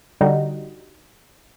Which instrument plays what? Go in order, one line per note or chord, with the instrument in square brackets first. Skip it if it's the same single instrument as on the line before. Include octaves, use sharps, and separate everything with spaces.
[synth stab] D3 G3 D#4 F#4